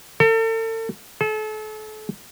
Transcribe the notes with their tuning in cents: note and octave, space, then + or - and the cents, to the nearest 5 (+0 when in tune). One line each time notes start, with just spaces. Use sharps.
A4 +40
A4 -35